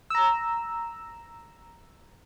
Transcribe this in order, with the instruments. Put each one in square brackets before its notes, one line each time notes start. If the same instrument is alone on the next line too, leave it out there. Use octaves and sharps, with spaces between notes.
[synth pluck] A#5 E6